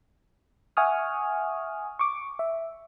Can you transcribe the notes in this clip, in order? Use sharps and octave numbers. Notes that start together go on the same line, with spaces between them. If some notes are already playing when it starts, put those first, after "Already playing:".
E5 F#5 G#5 C#6 D#6 F6
C#6 D6
E5